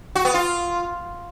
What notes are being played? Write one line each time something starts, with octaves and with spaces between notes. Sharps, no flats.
F#4
B3
F4